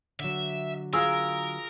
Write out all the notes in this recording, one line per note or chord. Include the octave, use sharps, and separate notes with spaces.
D3 F#3 E5
F4 G#4 A#4 E6